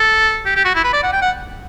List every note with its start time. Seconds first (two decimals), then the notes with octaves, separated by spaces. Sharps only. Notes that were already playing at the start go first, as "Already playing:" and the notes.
Already playing: A4
0.46 G4
0.56 G4
0.65 F#4
0.75 E4
0.84 B4
0.93 D5
1.03 F#5
1.13 G5
1.22 F#5